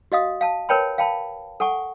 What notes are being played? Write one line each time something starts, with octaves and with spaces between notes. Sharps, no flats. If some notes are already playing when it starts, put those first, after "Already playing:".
F#4 D#5 F5 D#6
F5 A5
A#4 B4 C#5 G5 A5 B5
F5 G5 A5 B5
A4 F#5 G#5 C#6